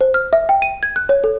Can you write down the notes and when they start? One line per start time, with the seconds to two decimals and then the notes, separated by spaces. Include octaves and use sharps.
0.01 C5
0.14 F6
0.33 E5
0.49 G5
0.62 D#7
0.83 G#6
0.96 F#6
1.09 C#5
1.24 A4